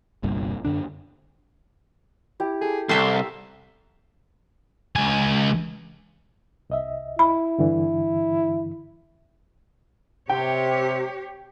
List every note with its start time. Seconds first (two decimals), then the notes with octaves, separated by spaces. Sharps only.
0.23 G1 C2 G2 A#2
0.65 F#2 D3 D4
2.40 E4 G4
2.61 G#4 A4
2.89 C2 A4 A#4 E5 G5 A5 C6 C#6
4.96 C#2 G#5
6.70 C2 D#5 E5
7.19 E4 B5
7.58 G2 D3 E3
10.29 C3 G4 C#5 G5